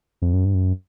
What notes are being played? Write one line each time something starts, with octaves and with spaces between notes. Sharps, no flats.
F2
F#2
G2
F#2